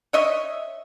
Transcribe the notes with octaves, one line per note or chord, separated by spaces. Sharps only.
C#5 D#5 E5